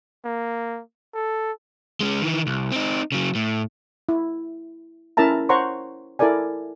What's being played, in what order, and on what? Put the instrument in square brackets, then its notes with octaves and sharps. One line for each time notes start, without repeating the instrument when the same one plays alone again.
[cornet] A#3
A4
[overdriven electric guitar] G#3 C#4
D#3 E3
C2
C4 D#4
C#3 F#3
A2
[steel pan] E4
C#4 E4 A#4 E5 A5 A#5
C5 C#5 F#5 A#5 C6 C#6
E4 A4 A#4 D5 G#5